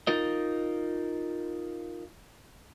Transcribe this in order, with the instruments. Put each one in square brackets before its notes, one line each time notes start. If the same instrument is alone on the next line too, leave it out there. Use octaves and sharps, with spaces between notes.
[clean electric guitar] D#4 F4 A#4 D#5